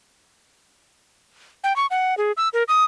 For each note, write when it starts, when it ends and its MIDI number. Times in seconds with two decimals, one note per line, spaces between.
1.64 1.76 79
1.76 1.86 85
1.91 2.17 78
2.18 2.32 68
2.37 2.49 88
2.53 2.63 70
2.68 2.85 87